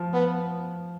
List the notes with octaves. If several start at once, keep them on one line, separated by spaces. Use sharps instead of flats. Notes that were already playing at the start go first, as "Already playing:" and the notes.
Already playing: F3
B3